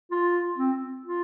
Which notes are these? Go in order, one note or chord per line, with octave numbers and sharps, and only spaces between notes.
F4
C4
F4